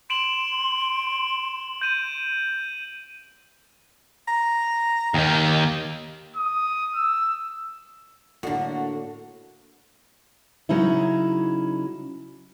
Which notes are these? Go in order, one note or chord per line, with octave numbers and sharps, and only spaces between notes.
C6 D7 E7 F#7
G6 D#7 E7
A#5
D#2 D#3
D#6
E6
A2 D3 A#3 D4 F#4
C#3 F#3 C#4 D#4 E4